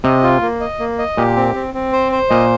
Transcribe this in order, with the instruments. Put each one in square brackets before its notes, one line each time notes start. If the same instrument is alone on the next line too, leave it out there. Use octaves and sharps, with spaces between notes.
[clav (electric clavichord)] C3 [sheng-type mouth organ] D#5
[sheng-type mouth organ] F4
A#3
D#5
A#3
D#5
[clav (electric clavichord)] A#2 [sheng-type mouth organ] G4
[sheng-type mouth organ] C4
C4
C4
C5
C5
[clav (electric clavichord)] A#2 [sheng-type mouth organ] D#5